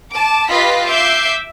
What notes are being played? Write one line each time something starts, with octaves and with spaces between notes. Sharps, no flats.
A5 D6
F4 G4 B4 D#5 B6
E5 D6 G6 C7